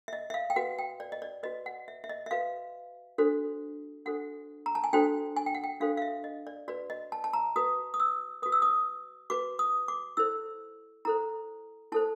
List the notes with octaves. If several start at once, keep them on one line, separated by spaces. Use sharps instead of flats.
E5
D#5
E5
F5
G5
F#4 B4 F#5
G5
D5
D#5
D5
F#4 B4 D#5
F#5
E5
E5
D#5
E5
F#4 B4 F5
D4 F#4 A4 C5
D4 F#4 A4 C5 F#5
A#5
A5
G#5
D4 F#4 A4 C5 G5
G#5
G5
F#5
G5
D4 F#4 A4 C5 F5
F5
E5
D#5
D5
F#4 B4 D5
D#5
A5
A5
A#5
F#4 B4 D#6
D#6
E6
F#4 B4 D#6
E6
D#6
F#4 B4 D6
D#6
D6
E4 A4 C5 E6
E4 A4 C5 A#5
E4 A4 C5 A5